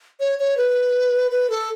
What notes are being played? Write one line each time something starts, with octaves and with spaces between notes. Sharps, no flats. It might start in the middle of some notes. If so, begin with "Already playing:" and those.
C#5
C#5
B4
B4
A4